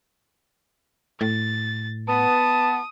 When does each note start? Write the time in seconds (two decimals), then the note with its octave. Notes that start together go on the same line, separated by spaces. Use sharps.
1.21 A2 A6
2.08 B3 A5 D#6